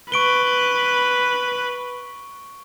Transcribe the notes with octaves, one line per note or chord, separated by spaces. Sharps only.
B4 C#6 D7 G7